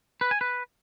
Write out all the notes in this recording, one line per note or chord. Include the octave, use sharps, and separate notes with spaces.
B4
G#5
B4